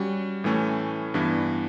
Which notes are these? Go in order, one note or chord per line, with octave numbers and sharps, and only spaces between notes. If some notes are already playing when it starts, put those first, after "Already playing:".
Already playing: G3 C#4 F#4
A2 E3 A3 C#4
G2 E3 B3 D4